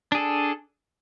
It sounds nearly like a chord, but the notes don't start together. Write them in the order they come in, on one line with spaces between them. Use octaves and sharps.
D4 G#4 A4